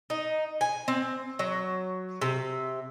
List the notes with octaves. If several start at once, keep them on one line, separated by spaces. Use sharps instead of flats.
D#4
G#5
C4
F#3
C3